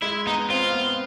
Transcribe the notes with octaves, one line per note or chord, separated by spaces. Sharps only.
G#3 E4
B3 D#4
C4 F4
B3